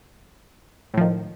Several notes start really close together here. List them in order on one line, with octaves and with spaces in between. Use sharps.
A2 F3 D#3